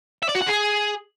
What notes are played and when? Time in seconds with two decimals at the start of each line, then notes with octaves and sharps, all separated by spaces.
0.23 E5
0.29 D5
0.35 F#4
0.41 F#5
0.47 G#4